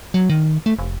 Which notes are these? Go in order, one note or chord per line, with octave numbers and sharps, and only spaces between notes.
F#3
D#3
A3
F1